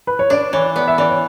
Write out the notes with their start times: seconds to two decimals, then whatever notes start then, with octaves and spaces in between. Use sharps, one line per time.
0.07 B4
0.19 C#5
0.30 D4 D5
0.53 E3 C#5
0.76 B3 D5
0.88 E5
0.98 E3 D5
1.09 C#5